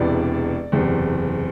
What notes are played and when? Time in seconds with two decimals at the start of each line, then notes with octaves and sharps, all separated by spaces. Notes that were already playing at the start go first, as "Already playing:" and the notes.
Already playing: E1 E2 C3 E3 B3 D5
0.72 F#1 E2 C3